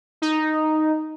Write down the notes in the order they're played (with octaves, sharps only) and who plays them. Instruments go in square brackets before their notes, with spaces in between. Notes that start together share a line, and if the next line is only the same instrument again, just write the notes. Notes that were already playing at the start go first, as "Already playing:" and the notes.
[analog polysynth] D#4